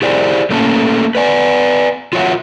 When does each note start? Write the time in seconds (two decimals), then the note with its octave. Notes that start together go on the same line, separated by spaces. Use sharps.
0.02 E4 G4 G#4 C5 D5
0.50 A3 A#3 C#4 A4
1.15 B4 D5 G#5
2.13 F4 F#4 C#5 D#5 E5 F#5